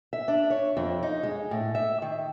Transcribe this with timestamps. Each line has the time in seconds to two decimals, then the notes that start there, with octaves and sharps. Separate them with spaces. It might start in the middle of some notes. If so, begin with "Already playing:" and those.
0.13 E5
0.28 D4
0.50 C#5
0.77 F2
1.03 D#4
1.23 G#3
1.51 A2
1.75 E5
2.02 D#3